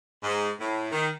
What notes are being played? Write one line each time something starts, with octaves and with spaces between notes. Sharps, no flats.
G#2
A2
D#3